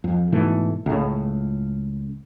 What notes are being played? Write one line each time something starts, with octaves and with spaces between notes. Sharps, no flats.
F2
G#2 B2 E3 A3
C#2 A2